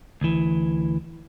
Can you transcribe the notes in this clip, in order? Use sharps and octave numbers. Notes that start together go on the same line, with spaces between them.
D2 E3